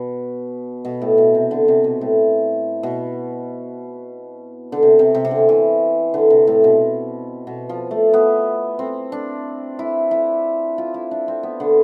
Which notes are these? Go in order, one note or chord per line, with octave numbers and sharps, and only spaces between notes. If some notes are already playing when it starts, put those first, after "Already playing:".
Already playing: B2
B2
A2
B2
C3
D3
C3
B2
A2
B2
D3
C3
C3
C3
C3
D3
E3
D3
C3
A2
B2
B2
F3
A3
B3
C4
D4
E4
E4
F4
E4
D4
C4
B3
D3